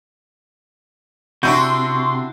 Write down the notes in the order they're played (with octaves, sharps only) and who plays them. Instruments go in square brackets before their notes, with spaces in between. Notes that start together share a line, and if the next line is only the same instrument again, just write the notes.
[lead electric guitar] C3 [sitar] D4 E4 F#4 [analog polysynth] C6 [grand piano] C#6 G6